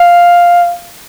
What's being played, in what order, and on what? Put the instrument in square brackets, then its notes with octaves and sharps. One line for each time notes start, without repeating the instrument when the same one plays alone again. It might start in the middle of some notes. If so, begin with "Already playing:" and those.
Already playing: [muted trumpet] F5